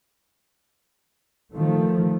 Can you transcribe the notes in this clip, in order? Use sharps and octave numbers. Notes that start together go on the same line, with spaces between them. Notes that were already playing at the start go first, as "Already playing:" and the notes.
D#3 F3 A3